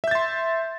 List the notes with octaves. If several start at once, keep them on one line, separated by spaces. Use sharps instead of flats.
E5 C6 G6 A6